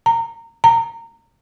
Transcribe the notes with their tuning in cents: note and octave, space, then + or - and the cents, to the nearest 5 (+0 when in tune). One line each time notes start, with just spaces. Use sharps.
A#5 -20
A#5 -20